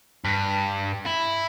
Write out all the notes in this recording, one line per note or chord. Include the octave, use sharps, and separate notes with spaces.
G2
E4